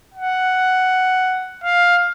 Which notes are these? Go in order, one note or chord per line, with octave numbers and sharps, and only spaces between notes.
F#5
F5